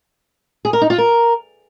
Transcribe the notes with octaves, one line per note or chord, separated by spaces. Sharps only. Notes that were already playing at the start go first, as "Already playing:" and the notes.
G#4
A#4
D#4
F4
A#4